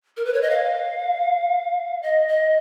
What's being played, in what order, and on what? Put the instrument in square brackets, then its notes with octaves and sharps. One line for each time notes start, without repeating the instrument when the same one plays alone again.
[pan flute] A#4
B4
C#5
D#5
F5
D#5
D#5